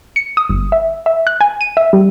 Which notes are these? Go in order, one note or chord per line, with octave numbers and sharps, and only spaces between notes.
C#7
D#6
G1
E5
E5
F#6
G#5
D#7
E5
G3